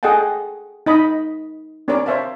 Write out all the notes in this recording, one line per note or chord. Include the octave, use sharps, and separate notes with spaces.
G#4 A4 D#5 F#5 G5 A5
D#4 D#5 B5
C4 D4 G4 A#4 C#5 D5
C5 C#5 E5 F5 A5